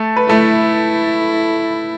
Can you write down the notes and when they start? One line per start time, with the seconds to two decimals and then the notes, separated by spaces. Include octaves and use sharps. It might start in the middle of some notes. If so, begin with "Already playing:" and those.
Already playing: A3 A4
0.16 B4
0.28 A3 E4 A4